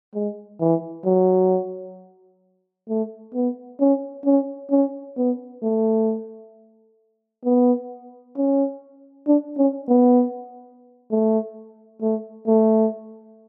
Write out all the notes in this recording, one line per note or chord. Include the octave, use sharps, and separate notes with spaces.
G#3
E3
F#3
A3
B3
C#4
C#4
C#4
B3
A3
B3
C#4
D4
C#4
B3
A3
A3
A3